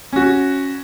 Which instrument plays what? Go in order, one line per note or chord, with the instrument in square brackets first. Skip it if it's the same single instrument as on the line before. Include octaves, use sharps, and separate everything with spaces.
[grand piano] C#4 F#4